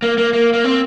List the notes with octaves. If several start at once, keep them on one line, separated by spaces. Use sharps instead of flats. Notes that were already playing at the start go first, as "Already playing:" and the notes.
A#3
A#3
A#3
A#3
C4